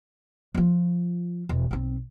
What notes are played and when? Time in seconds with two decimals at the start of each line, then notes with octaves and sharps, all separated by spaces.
0.54 F3 F4
1.49 E1
1.71 B1 C4